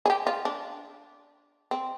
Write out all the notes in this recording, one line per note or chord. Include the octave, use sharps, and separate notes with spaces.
G#4
G4
F4
D4
C4